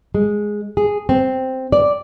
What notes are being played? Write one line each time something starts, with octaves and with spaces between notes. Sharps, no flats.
G#3
G#4
C4
D5